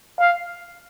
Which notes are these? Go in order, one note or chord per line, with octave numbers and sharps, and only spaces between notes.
F5